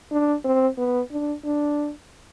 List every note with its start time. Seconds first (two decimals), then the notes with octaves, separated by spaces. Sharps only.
0.12 D4
0.44 C4
0.78 B3
1.11 D4
1.45 D4